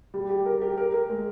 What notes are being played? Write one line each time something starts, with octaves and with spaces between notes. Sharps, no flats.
G3
G4
A#4
G4
A#4
A#4
G#3